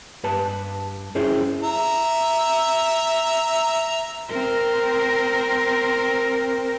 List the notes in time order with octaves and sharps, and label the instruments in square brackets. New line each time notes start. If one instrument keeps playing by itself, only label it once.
[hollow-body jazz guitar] G2 B4 A5
C#4 E4 G#4 C5 G5
[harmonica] E5 A#5
[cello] C4 A#4